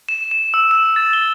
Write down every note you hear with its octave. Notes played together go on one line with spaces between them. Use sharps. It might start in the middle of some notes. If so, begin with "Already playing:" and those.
E7
E7
E6
E7
A6
G7